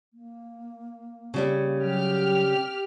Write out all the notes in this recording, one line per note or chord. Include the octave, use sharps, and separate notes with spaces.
A#3
C#3 G3 C#4
F#3 G4 F6